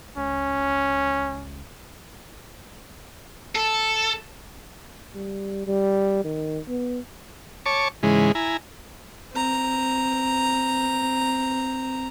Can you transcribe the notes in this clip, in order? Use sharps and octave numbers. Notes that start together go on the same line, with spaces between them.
C#2 C#4
A4
G3
G3
D#3
B3
C#5 A5 C#6 D6
G#2 C#3 E3 G#3
E4 G#5 A#5
C4 A#5